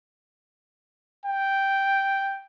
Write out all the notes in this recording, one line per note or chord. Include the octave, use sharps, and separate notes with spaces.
G5